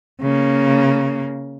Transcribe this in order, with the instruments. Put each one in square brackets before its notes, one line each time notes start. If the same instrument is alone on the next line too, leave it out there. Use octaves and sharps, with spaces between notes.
[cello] C#3 A#3